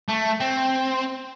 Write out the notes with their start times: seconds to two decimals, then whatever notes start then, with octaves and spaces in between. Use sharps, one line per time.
0.08 A3
0.40 C4